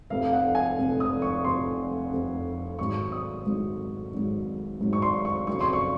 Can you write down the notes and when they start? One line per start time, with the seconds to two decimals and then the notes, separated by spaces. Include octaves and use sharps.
0.10 F1 F2 C3 F5
0.33 F#5
0.55 G#5
0.78 F1 F2 C3
1.00 D#6
1.22 C#6
1.45 F1 F2 C3 C6
2.12 F1 F2 C3
2.79 G#1 G#2 F#3 C#6
3.12 D#6
3.46 G#1 G#2 F#3
4.13 G#1 G#2 F#3
4.81 G#1 G#2 F#3
4.93 C#6
5.02 C6
5.25 C#6
5.47 F2 C#3 F#3 C#6
5.61 C6
5.73 C#6